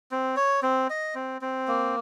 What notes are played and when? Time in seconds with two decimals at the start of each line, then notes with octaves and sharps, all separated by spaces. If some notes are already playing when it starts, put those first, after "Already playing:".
0.12 C4
0.37 C#5
0.63 C4
0.90 D#5
1.15 C4
1.42 C4
1.68 A#3